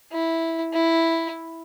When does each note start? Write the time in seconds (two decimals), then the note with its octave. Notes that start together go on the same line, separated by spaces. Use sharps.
0.12 E4
0.73 E4